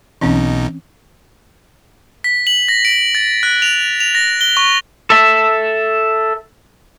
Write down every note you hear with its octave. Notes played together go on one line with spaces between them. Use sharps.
B1 B2 E3 C4 C#4 D#4
B6
F#7
A#6
D7
A6
F#6
F7
F7
A#6
G7
C#6
A4 E5